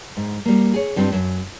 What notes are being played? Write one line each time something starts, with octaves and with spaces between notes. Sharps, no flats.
G#2
G3 A#3
G#4 C#5
G2 G3 C4 D4 F4
F#2